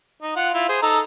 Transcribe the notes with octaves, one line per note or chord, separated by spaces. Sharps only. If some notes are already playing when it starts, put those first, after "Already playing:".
D#4
F4 F#5
E4 F4
G#4 C5
D#4 A4 A#5